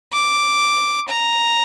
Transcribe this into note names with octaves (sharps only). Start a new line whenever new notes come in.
D6
A#5